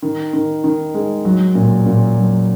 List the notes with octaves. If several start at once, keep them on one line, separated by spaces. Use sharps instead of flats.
D#3
D#3
D#3
G#3
F#3
A#2
A#2
F#3